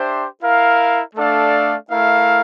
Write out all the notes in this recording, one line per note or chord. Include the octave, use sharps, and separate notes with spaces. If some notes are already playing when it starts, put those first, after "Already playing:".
Already playing: D4 G4 C5 E5
E4 A#4 F5
A3 D4 A4 D5 F5
A3 E4 A#4 F5